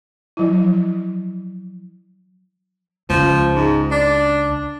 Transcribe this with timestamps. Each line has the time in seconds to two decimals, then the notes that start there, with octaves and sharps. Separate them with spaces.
0.37 F3 F#3 E4
3.10 C#2 F3
3.55 G#2
3.91 D4